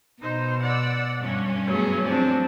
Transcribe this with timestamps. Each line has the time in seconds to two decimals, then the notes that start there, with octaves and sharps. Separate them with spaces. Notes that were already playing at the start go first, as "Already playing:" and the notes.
0.22 B2 D#4 C5
0.63 D5 F#5 E6
1.22 G2 C#4
1.67 F#3 A3 B3 G#4
2.05 F3 C4 D4 D5